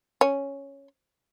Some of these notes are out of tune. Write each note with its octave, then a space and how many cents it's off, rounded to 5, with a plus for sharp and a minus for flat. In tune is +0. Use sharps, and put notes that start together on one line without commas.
C#4 +0 C#5 +0